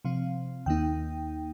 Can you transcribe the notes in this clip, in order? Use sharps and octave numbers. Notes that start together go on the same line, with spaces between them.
C3 F3 C4 F5
D#2 D#3 A#3 D#4 G5